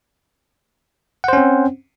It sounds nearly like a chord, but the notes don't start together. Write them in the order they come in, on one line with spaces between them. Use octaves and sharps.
F#5 C5 C#4 C4